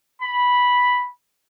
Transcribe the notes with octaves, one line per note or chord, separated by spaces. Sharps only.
B5